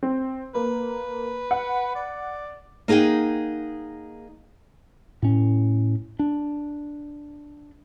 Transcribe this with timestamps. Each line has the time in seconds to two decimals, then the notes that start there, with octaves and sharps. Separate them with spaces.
0.03 C4
0.55 A#3 B4
1.51 F#5
1.95 D5
2.88 A#3 D#4 G#4 F#5 G5
5.22 A2 C#4
6.19 D4